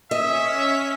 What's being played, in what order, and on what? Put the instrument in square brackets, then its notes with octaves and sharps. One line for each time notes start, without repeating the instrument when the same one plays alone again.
[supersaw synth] C#4 B6 [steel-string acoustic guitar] D#5 [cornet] E5